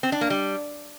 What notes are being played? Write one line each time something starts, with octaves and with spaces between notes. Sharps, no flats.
C4
D4
A#3
G3